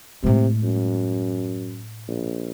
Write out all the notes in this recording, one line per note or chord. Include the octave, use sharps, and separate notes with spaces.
A2 C3 G#3
F#2
A#1